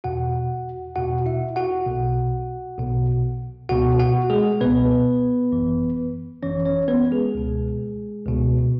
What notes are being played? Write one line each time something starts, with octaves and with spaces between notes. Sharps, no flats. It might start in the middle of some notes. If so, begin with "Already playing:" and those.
E2 B2 F#4 F#5
E2 B2 F#4 F#5
E4 E5
F#4 F#5
B1 B2
B1 B2
C#2 B2 F#4 F#5
F#4 F#5
G#3 G#4
C#2 B2 B3 B4
G#1 F#2 E3
G#1 F#2 E3 C#4 C#5
C#4 C#5
B3 B4
G#3 G#4
C#2 B2
C#2 B2